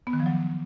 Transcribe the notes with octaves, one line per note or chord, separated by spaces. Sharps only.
B3
D#3
F3
F#3